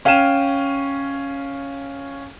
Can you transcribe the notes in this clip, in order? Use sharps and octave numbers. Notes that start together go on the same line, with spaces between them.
C#4 F5 G5 F6 D#7 E7